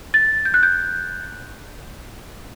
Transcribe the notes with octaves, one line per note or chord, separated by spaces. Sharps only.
A6
G6
F#6
G6